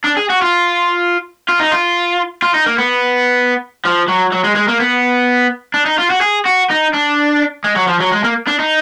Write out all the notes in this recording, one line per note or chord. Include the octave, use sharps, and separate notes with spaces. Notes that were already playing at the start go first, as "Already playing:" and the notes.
D4
G#4
F#4
F4
F4
D#4
F4
F4
D#4
A#3
B3
F3
F#3
F#3
G#3
G#3
A#3
B3
D4
D#4
F4
F#4
G#4
F#4
D#4
D4
G#3
F#3
F3
F#3
G#3
A#3
D4
D#4